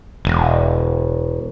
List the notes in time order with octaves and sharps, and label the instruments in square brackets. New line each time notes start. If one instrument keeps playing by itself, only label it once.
[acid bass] E1